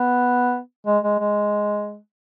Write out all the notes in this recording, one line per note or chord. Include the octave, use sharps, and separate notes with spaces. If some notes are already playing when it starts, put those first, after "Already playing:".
Already playing: B3
G#3
G#3
G#3